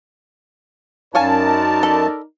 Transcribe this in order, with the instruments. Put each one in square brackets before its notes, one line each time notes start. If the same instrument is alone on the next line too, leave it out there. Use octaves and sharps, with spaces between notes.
[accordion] F#2 A5 [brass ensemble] D#4 A#4 D5 [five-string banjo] C#5 F5 G#5
[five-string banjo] A4 B5